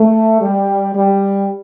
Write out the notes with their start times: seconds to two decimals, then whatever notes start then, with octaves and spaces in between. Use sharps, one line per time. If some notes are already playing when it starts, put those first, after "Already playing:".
Already playing: A3
0.40 G3
0.93 G3